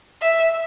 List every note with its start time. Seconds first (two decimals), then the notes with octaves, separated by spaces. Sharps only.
0.22 E5